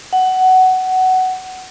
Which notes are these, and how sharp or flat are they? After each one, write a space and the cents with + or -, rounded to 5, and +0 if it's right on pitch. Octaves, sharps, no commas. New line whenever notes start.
F#5 +15